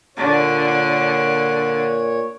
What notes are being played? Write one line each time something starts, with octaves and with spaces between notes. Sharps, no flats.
A#2 D3 C#5